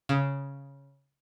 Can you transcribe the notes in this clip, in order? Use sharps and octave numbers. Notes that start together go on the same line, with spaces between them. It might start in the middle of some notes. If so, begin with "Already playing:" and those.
C#3